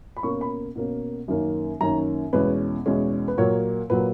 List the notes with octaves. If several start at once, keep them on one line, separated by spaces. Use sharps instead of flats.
B5
B2 A#3 C#4 C#6
B5
B2 A#3 C#4
F#2 D#3 A#3 C#4
F#2 D#3 A#3 C#4 A#5
E2 B2 G#3 C#4 B4
E2 B2 G#3 C#4
B4
A#2 F#3 A#3 C#5
A#2 F#3 A#3 B4